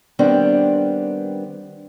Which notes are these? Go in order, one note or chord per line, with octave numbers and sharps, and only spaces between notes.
D#3 G3 B3 C4 D4